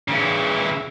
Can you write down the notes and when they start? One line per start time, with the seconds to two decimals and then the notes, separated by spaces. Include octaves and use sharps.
0.08 C#3 E3